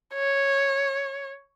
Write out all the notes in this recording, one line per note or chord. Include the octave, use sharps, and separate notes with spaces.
C#5